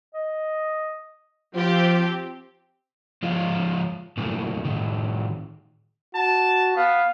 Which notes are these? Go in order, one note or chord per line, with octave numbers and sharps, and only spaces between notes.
D#5
F3 C4 F4 G4
F3 G#3 F4 C#5
A#2 F#3 A3
A2 D#3
F#4 A5
B3 F5